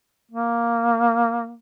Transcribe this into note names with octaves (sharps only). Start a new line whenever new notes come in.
A#3